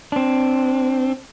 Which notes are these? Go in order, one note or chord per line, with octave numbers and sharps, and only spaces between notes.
C4 D4